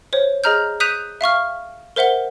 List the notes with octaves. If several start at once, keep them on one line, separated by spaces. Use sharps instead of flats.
C5 C#5
G#4 D#5 A#5 F6 G6
D#6 F#6 G6 B6 D#7 F7
E5 F5 C#6 F6
A#4 C5 E5 F#5 G7